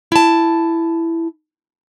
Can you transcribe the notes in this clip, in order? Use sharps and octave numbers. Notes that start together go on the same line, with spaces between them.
E4 A5